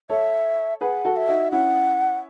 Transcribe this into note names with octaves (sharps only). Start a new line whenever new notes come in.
A4 C#5 E5
G#4 B4 F#5
F#4 A4
E5
D#4 F#4
C#4 E4 F#5